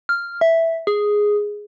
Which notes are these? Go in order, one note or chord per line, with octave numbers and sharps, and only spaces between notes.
F6
E5
G#4